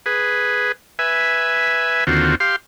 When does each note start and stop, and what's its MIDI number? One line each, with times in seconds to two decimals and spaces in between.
0.06 0.72 68
0.06 0.72 71
0.99 2.04 71
0.99 2.04 76
0.99 2.04 80
2.07 2.35 39
2.07 2.35 50
2.07 2.35 60
2.07 2.35 65
2.07 2.35 66
2.40 2.56 67
2.40 2.56 77
2.40 2.56 84